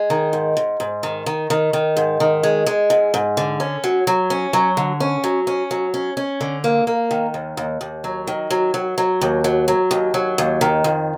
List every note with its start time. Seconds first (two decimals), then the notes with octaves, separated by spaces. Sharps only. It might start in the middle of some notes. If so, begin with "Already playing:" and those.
Already playing: G#3
0.10 D#3
0.33 G#2
0.57 G#2
0.80 G#2
1.03 D#3
1.26 D#3
1.50 D#3
1.73 D#3
1.97 G#2
2.20 D#3
2.43 G#3
2.66 G#3
2.90 G#2
3.14 G#2
3.37 D3
3.60 C#4
3.84 F#3
4.07 F#3
4.30 C#4
4.53 F#3
4.77 D3
5.00 C#4
5.24 F#3
5.47 C#4
5.71 F#3
5.94 C#4
6.17 C#4
6.41 D3
6.64 A#3
6.87 A#3
7.11 D#3
7.34 D#2
7.57 D#2
7.81 D#2
8.04 F#3
8.27 D#3
8.50 F#3
8.74 F#3
8.98 F#3
9.21 D#2
9.44 F#3
9.68 F#3
9.91 D#2
10.14 F#3
10.38 D#2
10.61 D#3
10.84 F2